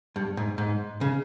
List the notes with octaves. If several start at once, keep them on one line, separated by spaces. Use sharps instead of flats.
G2
G#2
G#2
C#3